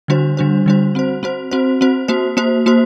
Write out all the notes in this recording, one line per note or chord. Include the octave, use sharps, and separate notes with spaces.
D3 G3 D4 F#4 C5
D3 G3 D4 F#4 C5
D3 G3 D4 F#4 C5
C4 F#4 C5
C4 F#4 C5
C4 F#4 C5
C4 F#4 C5
A#3 F#4 C5
A#3 F#4 C5
A#3 F#4 C5